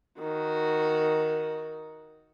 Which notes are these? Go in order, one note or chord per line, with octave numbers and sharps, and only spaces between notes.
D#3 F#4